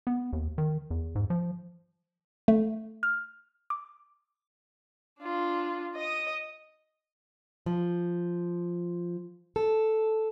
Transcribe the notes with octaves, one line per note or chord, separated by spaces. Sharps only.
B3
D#2
D#3
E2
G#2
F3
A3
F6
D6
D4 F4
D#5 D#6
F3
A4